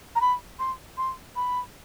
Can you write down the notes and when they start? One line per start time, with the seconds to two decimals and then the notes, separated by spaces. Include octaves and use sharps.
0.16 A#5
0.21 B5
0.59 C6
0.97 C6
1.36 B5